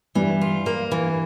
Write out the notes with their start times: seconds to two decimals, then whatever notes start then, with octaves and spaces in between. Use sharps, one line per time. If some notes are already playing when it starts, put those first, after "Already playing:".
0.15 G2 E3 G3
0.41 F4
0.66 A#3
0.92 E3